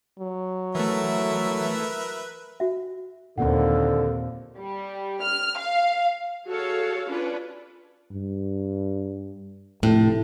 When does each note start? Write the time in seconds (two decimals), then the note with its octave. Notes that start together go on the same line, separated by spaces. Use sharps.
0.19 F#3
0.75 E3 A3 A#4 B4 E5
2.60 F#4 E5
3.38 D#2 A#2 D3 A#3 C4 F#5
4.58 G3
5.22 F6
5.58 F5
6.47 F#4 G#4 A4 C#5 F5
7.08 C#4 D4 F4 B4
8.12 G2
9.83 F1 A2